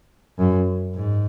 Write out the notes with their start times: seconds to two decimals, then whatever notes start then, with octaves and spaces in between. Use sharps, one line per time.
0.38 F#2
0.95 G#2